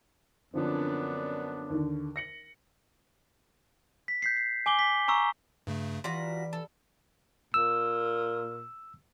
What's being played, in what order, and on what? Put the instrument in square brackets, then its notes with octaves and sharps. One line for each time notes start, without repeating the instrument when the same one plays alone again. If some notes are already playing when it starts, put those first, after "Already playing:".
[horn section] F#2 B3 D4 [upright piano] D3 F3 C4
[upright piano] D#2 D3
A#6 C#7 F#7
[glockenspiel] B6
G6 B6 C7
C7
G#5 D6 F#7 G7
B6
G#5 A#5 C#6 E6
[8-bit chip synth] G2 C#3 A3
[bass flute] E3 [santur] G3 [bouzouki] F4 F#4 A#5 [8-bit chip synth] B6
[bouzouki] A4
[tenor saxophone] A#2 [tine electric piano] E6